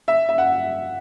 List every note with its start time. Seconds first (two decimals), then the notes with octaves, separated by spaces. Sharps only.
0.08 E5
0.29 E5
0.38 F#5